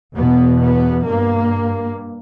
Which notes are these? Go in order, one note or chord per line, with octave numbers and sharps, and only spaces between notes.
E2 B2 B3
B3
G2 A#3